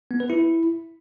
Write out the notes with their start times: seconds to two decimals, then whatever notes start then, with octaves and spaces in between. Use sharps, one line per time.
0.11 B3
0.20 B4
0.30 E4